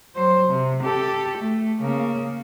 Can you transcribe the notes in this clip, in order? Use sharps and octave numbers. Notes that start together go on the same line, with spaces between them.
F#3 C5
C3
G4 A4
A3
C#3 A#3